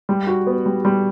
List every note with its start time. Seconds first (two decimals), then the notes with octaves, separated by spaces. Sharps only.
0.09 G3
0.27 F#4
0.47 B3
0.66 G3
0.85 G3